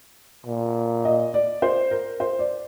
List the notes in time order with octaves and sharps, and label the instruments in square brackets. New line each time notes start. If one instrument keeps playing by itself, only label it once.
[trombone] A#2
[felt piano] D#5
D5
C5
A#4
C5
D5